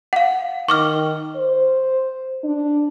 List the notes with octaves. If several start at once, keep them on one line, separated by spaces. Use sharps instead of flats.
F5 F#5
D#3 C#6 D6 F6
C5
D4